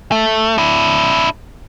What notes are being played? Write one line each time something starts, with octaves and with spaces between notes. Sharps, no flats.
A3
D4 E4